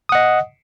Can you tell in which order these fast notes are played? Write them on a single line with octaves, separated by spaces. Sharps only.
D#6 F#5 D#5